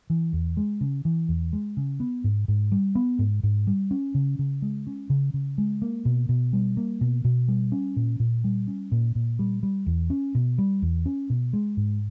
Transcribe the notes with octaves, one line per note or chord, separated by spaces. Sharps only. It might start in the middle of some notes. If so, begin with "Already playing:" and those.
E3
E2
G#3
C#3
E3
E2
G#3
C#3
B3
G#2
G#2
G3
B3
G#2
G#2
G3
C#4
C#3
C#3
G#3
C#4
C#3
C#3
G#3
A#3
B2
B2
G3
A#3
B2
B2
G3
C#4
A#2
A#2
G3
C#4
A#2
A#2
G3
G3
E2
C#4
B2
G3
E2
C#4
B2
G#3
G#2